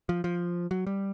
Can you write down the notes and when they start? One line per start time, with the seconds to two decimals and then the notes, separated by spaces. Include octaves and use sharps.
0.09 F3
0.24 F3
0.71 F#3
0.87 G3